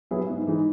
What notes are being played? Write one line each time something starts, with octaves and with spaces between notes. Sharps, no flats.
F#3 B3 E4 G#4
G#2
E3 G#3 D#4